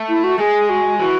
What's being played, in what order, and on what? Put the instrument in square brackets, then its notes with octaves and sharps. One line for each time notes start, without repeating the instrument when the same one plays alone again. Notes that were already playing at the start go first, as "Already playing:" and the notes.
Already playing: [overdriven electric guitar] A3
[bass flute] E4
F#4
[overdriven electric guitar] G#3 [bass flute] G#4
[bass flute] F#4
[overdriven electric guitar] E3 [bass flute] F#4